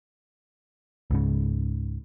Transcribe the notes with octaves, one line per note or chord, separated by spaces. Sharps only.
C#2 G#2 C#3